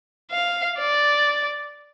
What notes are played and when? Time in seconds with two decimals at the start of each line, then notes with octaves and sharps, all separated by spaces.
0.32 F5
0.79 D5